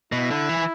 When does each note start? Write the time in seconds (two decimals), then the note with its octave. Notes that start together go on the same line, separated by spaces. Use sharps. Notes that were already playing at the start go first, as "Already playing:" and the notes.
0.12 B2 E4
0.31 D3
0.49 E3